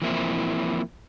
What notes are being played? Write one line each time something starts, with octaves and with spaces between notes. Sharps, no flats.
E3 F3 A#3 C4 E4